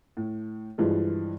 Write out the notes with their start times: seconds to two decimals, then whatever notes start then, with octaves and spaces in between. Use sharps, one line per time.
0.17 A2
0.78 G2 E3 F3 G#3